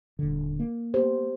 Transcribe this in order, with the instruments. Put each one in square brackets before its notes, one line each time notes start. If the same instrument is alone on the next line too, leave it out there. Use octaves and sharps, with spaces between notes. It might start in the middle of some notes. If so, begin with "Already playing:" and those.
[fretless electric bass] D#1 D3
A#3
[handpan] B3 G4 C5